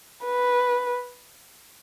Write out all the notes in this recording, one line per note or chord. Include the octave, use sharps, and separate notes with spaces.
B4